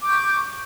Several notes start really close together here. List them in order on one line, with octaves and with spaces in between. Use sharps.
D6 G6 C#6